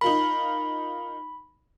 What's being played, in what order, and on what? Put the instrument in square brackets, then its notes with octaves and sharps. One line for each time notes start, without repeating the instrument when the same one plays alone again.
[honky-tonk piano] D#4 F4 A#4 [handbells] B5